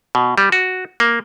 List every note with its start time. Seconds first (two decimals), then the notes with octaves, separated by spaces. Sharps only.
0.15 B2
0.38 G3
0.52 F#4
1.00 A#3